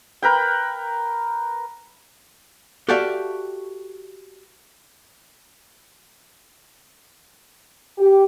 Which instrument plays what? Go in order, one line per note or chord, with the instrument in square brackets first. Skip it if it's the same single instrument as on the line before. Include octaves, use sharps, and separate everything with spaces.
[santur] A#4 B4 G5
[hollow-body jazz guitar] F#4 G4 A4 D5 E5 F5
[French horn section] G4